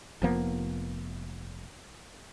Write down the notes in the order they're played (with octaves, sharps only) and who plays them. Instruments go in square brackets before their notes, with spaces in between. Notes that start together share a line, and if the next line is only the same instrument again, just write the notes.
[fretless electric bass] F1 F3 A#3 B3